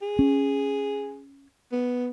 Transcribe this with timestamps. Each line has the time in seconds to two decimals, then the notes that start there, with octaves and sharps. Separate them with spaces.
0.02 G#4
0.19 C#4
1.72 B3